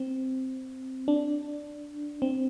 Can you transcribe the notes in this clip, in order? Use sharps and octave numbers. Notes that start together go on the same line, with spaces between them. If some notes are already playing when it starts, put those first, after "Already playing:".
Already playing: C4
D4
C4